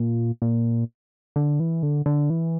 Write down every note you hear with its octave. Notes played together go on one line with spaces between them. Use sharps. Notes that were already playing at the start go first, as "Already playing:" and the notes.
Already playing: A#2
A#2
D3
E3
D3
D3
E3